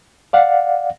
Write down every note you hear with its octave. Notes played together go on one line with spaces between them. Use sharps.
D5 F5 F#5